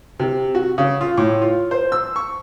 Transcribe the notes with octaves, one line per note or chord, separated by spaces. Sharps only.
C3
F#4
C#3
F4
A2
F4
C5
E6
C#6